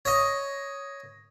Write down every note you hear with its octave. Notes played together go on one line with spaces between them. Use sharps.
C#5 D#5